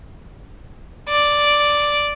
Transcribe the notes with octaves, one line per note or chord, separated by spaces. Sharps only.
D5